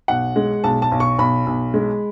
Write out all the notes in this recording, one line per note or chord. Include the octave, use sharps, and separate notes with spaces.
B1 F#5
G#3
B1 A5
A5
B1
C#6
B1 B5
B1
G#3